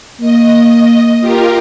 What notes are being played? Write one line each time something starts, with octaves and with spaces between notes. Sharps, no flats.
A#3 D#5
F4 G4 A#4